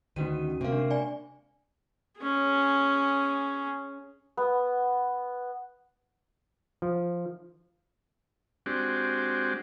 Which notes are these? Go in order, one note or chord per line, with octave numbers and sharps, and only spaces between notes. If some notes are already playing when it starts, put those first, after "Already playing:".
D2 D#3 C#4 F#4 D#7
C3 G#3 A#3 F5
D4
D5 G#5
C#4 G#4
B3
F3
G#3 C4 D4 F#4 G4